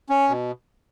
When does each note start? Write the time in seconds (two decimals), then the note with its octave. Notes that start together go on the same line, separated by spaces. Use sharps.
0.09 C#4
0.29 B2